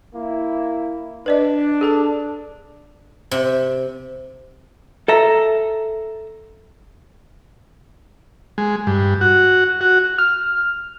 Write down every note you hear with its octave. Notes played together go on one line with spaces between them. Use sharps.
A#3 E4
D4 B4 D5 D#5
G#4 A4 A5
C3
A4 E5 A#5
G#3
G2
F#4
F#4
F6